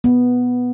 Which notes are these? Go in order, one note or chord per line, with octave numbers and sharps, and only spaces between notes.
B3